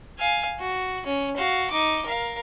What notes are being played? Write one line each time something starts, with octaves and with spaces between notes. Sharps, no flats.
F5 G#5
F#4
C#4
F#4 F5
D#4 D6
A#4 F5